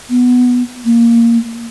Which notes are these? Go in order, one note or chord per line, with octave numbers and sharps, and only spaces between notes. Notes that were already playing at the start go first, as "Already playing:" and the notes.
B3
A#3